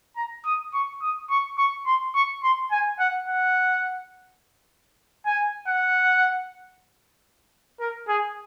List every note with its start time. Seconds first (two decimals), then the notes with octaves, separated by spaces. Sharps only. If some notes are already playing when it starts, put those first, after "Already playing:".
0.17 A#5
0.45 D#6
0.74 C#6
1.01 D#6
1.30 C#6
1.58 C#6
1.86 C6
2.15 C#6
2.43 C6
2.71 G#5
2.99 F#5
3.28 F#5
5.26 G#5
5.68 F#5
7.80 A#4
8.08 G#4